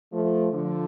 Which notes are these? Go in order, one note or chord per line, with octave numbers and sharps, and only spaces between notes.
F3 A3
D3 F3